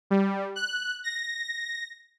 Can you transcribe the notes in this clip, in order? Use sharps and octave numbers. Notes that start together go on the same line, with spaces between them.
G3
F#6
A#6